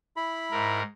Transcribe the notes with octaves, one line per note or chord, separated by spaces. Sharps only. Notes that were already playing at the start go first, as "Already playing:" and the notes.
E4 B5
G#2 A#4